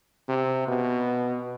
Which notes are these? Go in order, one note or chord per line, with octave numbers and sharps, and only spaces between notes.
C3
B2